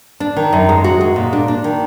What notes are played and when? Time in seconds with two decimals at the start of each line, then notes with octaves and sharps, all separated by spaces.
0.20 D4
0.37 D#3
0.53 F#2
0.69 G#3
0.84 F#4
1.01 G#3
1.16 A#2
1.33 D4
1.48 D4
1.64 D#3